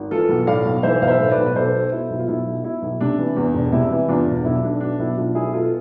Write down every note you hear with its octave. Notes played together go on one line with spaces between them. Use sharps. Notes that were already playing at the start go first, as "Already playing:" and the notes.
Already playing: G#1
E3 F4 A4
B1
A2 D5 F5
B1
E3 C5 E5
B1 F5
C5 E5
A2
B4 D5
B1
B4
B1 A4 C5
B2
B2 E4
B1
F4
B1 E4
B2
B2 E4
B1
C3 D4
E3
E2
E1
C3 E4
E3
E2 D4 F4
E1
B1 E4
B2 D4
B2 D4
B1 E4
B1 D4 F4
B2 E4 G#4
B2 F4 A4